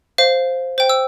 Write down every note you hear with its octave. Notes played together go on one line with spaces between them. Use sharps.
C5 F5
C5 G5
E6